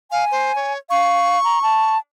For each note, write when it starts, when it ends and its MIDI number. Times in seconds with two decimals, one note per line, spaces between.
0.12 0.25 77
0.12 0.73 80
0.31 0.54 72
0.56 0.77 73
0.90 1.42 77
0.90 1.95 85
1.44 1.59 82
1.62 1.98 81